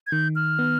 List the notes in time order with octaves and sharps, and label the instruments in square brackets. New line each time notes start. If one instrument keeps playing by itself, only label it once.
[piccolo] G#6
[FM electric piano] D#3 [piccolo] G6
[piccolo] F6
[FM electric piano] B3